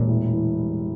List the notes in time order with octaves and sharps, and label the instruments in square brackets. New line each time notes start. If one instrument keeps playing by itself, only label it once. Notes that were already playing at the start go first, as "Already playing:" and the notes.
Already playing: [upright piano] E1 [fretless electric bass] A#2
[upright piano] A2
E3
G3